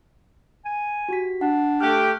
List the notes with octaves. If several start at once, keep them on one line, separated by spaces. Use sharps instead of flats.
G#5
F#4 G4 B6
D4 F#5
A3 G4 F6 F#6